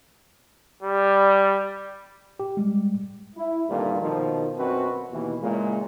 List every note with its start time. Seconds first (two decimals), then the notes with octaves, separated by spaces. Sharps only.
0.83 G3
2.40 G4
2.57 G3 G#3
3.36 E4
3.69 C2 G2 A#2 D3 D#3 A3
4.01 B2 D#3 F3
4.57 F#2 B2 C4 F#4 B4
5.12 D#2 B2 E3
5.42 A#2 C#3 E3 G#3